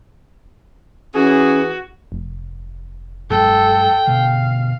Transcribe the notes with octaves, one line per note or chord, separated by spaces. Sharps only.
E3 C#4 F#4 G#4
F1
G2 F#3 G#3 A4 G5
G2 B2 D3 F5